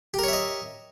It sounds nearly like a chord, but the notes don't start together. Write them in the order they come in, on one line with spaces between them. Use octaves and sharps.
G4 A#4 C#5 E5 D#5